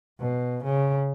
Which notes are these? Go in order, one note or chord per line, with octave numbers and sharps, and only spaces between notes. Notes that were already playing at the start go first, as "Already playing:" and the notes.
B2
C#3